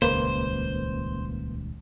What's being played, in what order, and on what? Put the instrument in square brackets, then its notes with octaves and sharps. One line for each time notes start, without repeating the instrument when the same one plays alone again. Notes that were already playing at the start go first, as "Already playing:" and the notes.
[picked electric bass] D#1 C#2 [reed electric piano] A#3 B4 [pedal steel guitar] C5